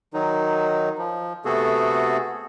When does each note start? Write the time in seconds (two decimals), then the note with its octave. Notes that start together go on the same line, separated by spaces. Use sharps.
0.14 D#3 F#3 D#4
0.98 F3
1.45 C3 A3 B3 F#4 G#4 A4